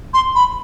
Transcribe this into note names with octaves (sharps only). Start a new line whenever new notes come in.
C6
B5